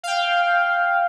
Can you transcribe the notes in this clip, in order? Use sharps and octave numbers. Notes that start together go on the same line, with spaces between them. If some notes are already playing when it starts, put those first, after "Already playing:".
F5 G5